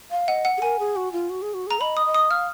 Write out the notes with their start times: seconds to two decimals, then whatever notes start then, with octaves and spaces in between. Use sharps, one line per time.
0.11 F5
0.28 D#5 F#5
0.45 F#5
0.57 G#4
0.62 A#4 G#5
0.79 G#4
0.96 F#4
1.12 F4
1.30 F#4
1.42 G#4
1.54 F#4
1.67 G#4 A#5
1.80 D#5 B5
1.97 D#6
2.06 D#5
2.14 D#6
2.30 F5 F6